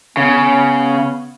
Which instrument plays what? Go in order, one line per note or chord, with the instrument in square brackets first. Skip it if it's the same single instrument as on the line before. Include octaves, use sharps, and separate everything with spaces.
[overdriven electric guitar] C#3 [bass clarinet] B3